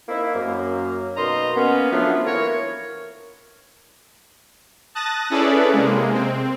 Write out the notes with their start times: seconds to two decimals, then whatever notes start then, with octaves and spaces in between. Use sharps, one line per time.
0.09 A#3 C4 D#4 E4
0.35 F#2 A#3
1.17 B2 A#3 D#4 D#5 A#5 C6
1.57 A#3 B3 C#4
1.92 F3 F#3 A3 B3 D4 F4
2.26 E3 A#3 E4 A#4 C#5
4.95 A5 D#6 F#6 A6 A#6
5.30 C#4 E4 G#4 A4 B4 D5
5.72 C3 G#3 A#3
6.14 C4